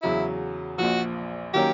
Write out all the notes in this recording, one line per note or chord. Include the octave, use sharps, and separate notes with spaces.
E2 C#3 F#3 E4
A#1 A#2 F3 F#4
D#3 F#3 A#3 C#4 G4